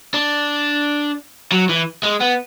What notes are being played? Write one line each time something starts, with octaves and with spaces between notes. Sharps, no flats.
D4
F#3
E3
G#3
B3